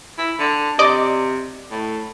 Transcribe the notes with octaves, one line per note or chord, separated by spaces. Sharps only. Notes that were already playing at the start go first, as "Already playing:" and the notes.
E4
D3
C3 D5 D#5
A2